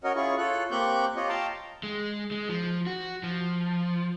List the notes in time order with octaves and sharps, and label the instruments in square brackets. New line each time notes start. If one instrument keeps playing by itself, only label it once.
[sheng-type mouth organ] C#4 F#4 A#4 C#5 D#5
C#4 E4 F4 G#4 C#6
F4 A4 C#5 F#6
A#3 C4 G4 C#6 F#6 G6
F4 G4 C#5 D#5
F5 G5 A5 A#5 C6
[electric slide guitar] G#3
G#3
F3
F#4
F3